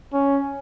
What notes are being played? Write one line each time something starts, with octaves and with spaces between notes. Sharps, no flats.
C#4